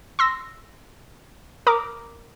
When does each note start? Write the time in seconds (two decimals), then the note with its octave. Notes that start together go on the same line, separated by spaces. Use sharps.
0.19 C6 E6 A#6
1.67 A#4 A#5 D6 D#6